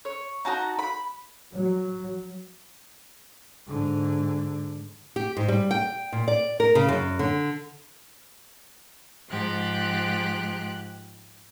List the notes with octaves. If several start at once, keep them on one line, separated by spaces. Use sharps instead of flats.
C#5
D#4 F#4 A5 A#5
B5
F#3
G#2 D3
G4
G#2
G3
G5
A#2
D5
A#4
C#3
F#2
D3
G#2 F3 G4 F#6